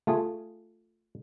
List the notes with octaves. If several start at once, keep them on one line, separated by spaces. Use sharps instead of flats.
A3 F4 G#4